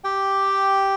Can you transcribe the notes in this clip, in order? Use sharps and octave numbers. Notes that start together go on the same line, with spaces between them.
G4 G5